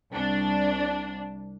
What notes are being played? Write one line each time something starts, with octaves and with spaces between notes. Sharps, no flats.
C2 D4